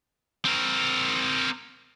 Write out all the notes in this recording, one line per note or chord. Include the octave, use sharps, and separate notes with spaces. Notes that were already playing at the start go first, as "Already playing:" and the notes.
C4 A#4